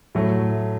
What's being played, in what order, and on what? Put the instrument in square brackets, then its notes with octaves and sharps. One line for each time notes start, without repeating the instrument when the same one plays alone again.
[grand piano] A2 F#3 A3